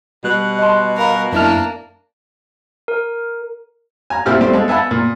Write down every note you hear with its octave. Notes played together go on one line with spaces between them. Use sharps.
B2 G3 F#6
D#5 A5 C6
A#4 F5 B5
F#2 A#3 D4 E4 F6
A#4
G#5 A#5
A#2 C4 E4 G4 F6
G3 A3 C4 G4 C5
G#3 A4
B3 E5 G#5 A5 B5
A#2